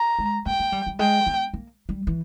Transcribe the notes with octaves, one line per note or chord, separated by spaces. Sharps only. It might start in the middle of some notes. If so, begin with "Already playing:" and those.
Already playing: A#5
G#3
A#3 G5
A#3
G3
G3
G#3 G5
B3
A#3
G3
E3